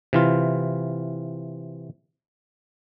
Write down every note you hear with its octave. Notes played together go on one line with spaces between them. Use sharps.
C3 E3 F4